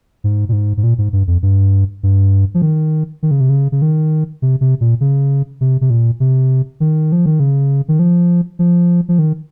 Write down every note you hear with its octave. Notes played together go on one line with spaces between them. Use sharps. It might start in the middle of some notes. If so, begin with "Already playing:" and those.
G#2
A#2
G#2
G#2
A#2
G#2
G2
F2
G2
G2
F3
D#3
D#3
C#3
C3
C#3
C#3
D#3
C3
C3
A#2
C#3
C3
C3
A#2
C3
D#3
F3
D#3
C#3
D#3
F3
F3
F3
D#3